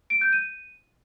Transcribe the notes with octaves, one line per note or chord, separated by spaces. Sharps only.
D7
G6
D#7